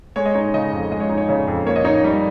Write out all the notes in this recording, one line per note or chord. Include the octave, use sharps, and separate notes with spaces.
G#3 C#5
D#5
D#4 C#5
C#3 D#5
F2
G#3 D#5
C#5
D#4
C#5
C#3
F2
A#3 C#5
D#5
D#4 C#5
G3